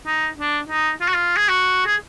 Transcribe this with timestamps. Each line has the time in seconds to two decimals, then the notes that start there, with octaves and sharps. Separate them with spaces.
0.06 D#4
0.38 D4
0.69 D#4
1.01 F4
1.08 F#4
1.15 F4
1.37 G#4
1.49 F#4
1.86 G#4